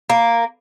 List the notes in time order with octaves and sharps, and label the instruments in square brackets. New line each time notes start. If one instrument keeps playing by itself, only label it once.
[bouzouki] A#3